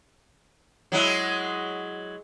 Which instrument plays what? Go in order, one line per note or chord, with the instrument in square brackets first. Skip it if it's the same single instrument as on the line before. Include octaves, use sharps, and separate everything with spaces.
[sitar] F#3 G#3 E4